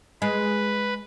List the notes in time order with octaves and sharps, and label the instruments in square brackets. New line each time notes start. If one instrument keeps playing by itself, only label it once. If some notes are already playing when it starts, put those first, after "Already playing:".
[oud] G#3 [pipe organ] B4